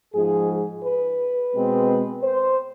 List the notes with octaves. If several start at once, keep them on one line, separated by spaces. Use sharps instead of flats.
G#2 F3 G#3 G#4
B4
B2 G#3 C4
C5